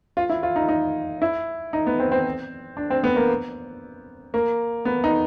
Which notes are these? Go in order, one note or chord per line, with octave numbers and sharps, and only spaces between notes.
F4
E4
F4
D#4
D#4
E4
D#4
B3
C4
C4
D4
C4
B3
A#3
A#3
B3
D#4